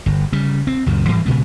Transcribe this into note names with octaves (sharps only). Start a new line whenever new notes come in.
G1
C#3 G3
C4
C#2 F#2 A#2
G#2 E3 G3 G#3
A#2 C#3 G#3 B3